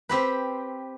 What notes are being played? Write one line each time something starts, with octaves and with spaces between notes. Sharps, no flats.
C4 G4 B4